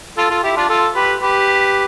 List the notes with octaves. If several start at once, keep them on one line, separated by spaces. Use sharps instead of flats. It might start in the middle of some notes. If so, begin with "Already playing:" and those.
F4 A4
F4 A4
E4 G4
D4 F4
F4 A4
G4 B4
G4 B4